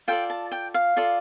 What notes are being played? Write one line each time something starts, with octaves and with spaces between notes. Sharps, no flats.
F4 A4 D5 G5
A5
G5
F5
F4 A4 D5